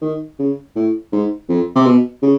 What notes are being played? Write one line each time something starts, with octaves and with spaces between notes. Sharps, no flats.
D#3
C#3
A2
G#2
F2
C3
B2
C#3